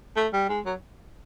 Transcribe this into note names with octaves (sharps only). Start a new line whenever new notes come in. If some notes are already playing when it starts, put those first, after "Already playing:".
A3
G3
G#3
F#3